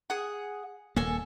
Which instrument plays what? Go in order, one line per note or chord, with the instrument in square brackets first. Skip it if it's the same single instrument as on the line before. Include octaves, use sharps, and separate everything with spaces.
[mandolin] G#4 F#5
[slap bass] D#1 A#3 [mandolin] A4 G#5